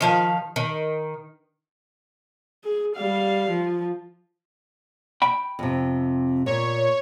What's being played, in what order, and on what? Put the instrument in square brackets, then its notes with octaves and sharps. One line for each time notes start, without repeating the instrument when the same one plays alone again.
[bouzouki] D#3 F3 F5
D#3
[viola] G#4
G3 F5
F3
[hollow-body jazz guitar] G5 B5
[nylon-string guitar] F2 C3
[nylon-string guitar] A#2 [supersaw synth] C#5